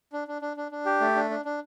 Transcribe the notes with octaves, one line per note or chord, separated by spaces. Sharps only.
D4
D4
D4
D4
D4
G4
A3
D4
D4
D4